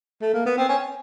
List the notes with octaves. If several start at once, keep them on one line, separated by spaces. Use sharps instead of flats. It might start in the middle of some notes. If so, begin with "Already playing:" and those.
A3
A#3
B3
C4
C#4